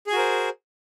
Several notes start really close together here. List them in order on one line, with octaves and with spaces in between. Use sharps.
G#4 G#5 F#4 A#4 C5